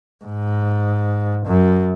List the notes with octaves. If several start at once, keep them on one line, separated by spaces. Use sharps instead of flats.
G#2
F#2